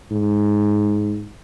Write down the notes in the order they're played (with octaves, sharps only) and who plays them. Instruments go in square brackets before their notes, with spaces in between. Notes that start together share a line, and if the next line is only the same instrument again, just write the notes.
[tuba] G#2